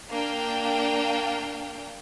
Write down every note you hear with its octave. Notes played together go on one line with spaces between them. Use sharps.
A#3 D4 F5 G5